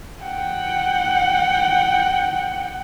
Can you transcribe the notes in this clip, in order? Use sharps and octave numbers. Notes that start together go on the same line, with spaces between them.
F#5 G5